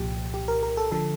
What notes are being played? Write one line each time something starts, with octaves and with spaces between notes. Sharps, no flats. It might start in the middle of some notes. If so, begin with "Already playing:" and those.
Already playing: C2 A#2 F3 G4
G4
A#4
A#4
A4
D3 F3 A4